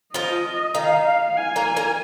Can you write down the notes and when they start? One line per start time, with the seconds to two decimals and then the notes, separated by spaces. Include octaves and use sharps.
0.14 F3 F4 D#5
0.75 D#3 D#4 F5
1.36 G#5
1.56 A#3 A#4
1.76 A#3 A#4